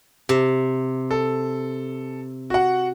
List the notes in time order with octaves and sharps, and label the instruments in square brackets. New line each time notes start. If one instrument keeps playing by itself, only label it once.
[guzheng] C3
[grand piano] A4
F#4 F#5